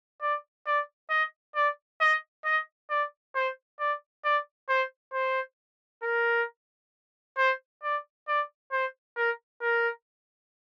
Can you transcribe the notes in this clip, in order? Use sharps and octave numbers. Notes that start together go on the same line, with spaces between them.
D5
D5
D#5
D5
D#5
D#5
D5
C5
D5
D5
C5
C5
A#4
C5
D5
D5
C5
A#4
A#4